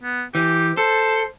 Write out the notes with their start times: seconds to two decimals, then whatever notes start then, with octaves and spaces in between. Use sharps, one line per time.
0.03 B3
0.35 E3 G4
0.77 A4 C5